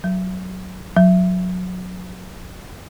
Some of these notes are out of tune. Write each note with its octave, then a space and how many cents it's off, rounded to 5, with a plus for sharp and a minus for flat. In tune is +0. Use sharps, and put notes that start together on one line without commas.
F#3 +0
F#3 -20